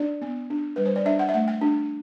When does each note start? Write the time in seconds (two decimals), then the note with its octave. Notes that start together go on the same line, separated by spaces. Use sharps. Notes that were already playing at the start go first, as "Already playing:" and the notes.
Already playing: D4 D5
0.22 B3
0.50 D4
0.76 G3 B4
0.86 C5
0.96 D5
1.05 D4 E5
1.19 F#5
1.29 E5
1.34 A3 F#5
1.48 G5
1.61 D4